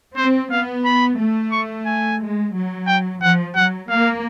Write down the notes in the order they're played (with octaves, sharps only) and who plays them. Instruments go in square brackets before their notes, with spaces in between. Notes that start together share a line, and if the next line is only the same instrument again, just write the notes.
[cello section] C4 [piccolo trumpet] C5
[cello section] B3 [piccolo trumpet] F5
[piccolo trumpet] B5
[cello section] A3
[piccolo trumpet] C#6
G#5
[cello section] G#3
F#3
[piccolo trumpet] G5
[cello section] F3 [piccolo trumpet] F#5
[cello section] F#3 [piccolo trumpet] F#5
[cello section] A#3 [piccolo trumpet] F5